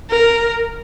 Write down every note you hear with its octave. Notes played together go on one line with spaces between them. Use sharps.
A#4